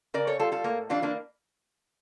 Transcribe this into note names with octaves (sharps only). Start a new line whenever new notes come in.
C#3 A#4 D5
A4 C#5
G3 F4 A4
F4 A4
A2 A#3
E3 G3 D4 F4
A#3 D4